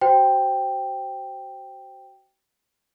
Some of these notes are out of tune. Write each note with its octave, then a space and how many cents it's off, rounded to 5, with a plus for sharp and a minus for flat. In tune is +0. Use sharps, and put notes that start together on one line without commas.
F#4 +30 C5 +0 G5 +0